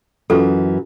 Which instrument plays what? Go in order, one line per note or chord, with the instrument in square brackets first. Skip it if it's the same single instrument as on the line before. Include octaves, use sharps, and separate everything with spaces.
[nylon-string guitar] F#2 E3 [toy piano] F4 A4